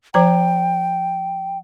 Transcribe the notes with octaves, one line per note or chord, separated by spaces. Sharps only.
F3 C5 G5 A#5